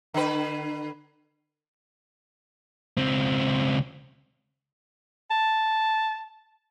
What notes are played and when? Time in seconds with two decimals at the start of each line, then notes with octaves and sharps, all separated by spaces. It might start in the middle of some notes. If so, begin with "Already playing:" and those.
0.14 D3 B4
2.97 C#2 C4
5.31 A5